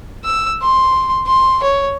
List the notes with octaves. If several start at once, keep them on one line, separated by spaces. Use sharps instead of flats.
E6
C6
C6
C#5